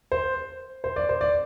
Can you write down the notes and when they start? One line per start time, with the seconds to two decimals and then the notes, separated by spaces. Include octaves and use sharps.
0.12 C5
0.84 C5
0.96 D5
1.09 C5
1.21 D5